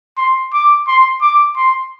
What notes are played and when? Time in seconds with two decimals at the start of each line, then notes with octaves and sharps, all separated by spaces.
0.17 C6
0.53 D6
0.88 C6
1.21 D6
1.56 C6